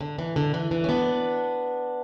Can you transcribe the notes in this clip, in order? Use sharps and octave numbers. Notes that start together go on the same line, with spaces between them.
D3
E3
D3
E3
E3
C#4
B3 D4